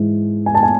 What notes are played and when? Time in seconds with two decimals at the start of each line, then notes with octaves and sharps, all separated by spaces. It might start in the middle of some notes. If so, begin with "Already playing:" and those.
Already playing: G#2 E3 G#3
0.46 G#5
0.55 A5
0.63 G#5